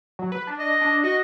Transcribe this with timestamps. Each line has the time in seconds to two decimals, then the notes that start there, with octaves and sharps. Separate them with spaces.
0.19 F#3
0.32 B4
0.47 D4
0.59 D#5
0.82 D4
1.04 F#4 D#5